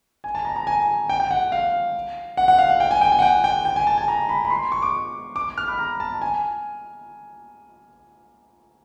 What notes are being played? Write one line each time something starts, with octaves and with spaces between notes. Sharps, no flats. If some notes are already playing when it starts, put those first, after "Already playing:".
G#5
A5
A#5
A#5
G#5
G5
G5
F#5
F5
F#5
F#5
F5
F#5
G5
G#5
G5
G#5
F#5
G5
G5
G5
G#5
A5
G#5
A#5
B5
B5
C6
C#6
D6
D6
F6
B5
A#5
A5
G#5